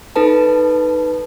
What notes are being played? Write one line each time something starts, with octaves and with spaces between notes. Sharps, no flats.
D#4 A4 B4 A5